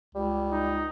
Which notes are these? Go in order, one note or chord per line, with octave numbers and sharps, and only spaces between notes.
C#2 G3
D#4